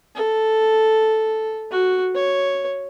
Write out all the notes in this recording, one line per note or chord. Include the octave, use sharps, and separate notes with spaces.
A4
F#4
C#5